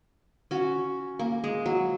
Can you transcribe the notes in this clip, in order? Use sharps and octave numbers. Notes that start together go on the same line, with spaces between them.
C#4 F#4
A#3
G#3
F#3